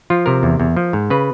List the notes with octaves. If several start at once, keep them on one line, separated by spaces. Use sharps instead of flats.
F3 F4
C3 A#4
E2
E2
F3
G#2
C#3 B4